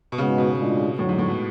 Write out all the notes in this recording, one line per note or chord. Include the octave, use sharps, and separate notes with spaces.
B2
G#2 C#3 G#3 B3 F#4 B4
B2
A2 G#3 D4 F4
F2 A2 D3 F#3
G#2
A2
B2